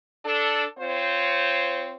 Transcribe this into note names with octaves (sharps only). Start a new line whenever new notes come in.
D4 A4
C4 F4 C5 C#5